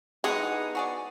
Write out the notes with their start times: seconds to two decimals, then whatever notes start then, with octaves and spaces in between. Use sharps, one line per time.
0.24 E3 G#3 B3 D4 D#4 F#5 D#6
0.75 F#4 G#4 D5